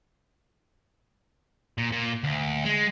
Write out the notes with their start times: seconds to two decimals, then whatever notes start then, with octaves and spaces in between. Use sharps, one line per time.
1.78 A#2
1.92 A#2
2.24 D2
2.65 G#3